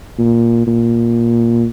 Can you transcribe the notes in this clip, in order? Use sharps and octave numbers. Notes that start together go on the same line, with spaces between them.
A#2
A#2